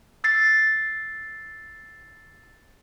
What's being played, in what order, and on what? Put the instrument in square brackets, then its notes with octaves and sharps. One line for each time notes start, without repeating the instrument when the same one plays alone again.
[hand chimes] E6 A6 C7